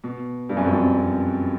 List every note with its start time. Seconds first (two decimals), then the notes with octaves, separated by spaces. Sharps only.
0.04 B2
0.49 G2
0.57 F#2
0.64 F2
0.72 F#2
0.95 F2